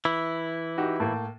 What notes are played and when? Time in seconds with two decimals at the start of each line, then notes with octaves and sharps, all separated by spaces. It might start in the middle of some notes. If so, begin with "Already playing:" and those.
0.05 E3 E4
0.77 D#4 F#4 G4
1.00 A2 A#3